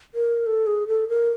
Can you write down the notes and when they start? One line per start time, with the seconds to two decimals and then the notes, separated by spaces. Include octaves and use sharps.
0.15 A#4
0.46 A4
0.67 G#4
0.87 A4
1.09 A#4